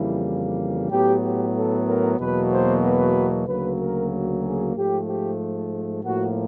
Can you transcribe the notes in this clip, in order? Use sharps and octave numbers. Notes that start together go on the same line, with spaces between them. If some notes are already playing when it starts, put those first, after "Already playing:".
Already playing: F2 C#3 E3 G3 A#3 E4
A2 F#3 B3 G4
G4
A4
A#4
E2 B2 F#3 A#3 B4
C5
B4
D2 C#3 F#3 A#3 B4
A#4
G#4
G#2 F3 A3 G4
G4
A2 F3 A#3 F#4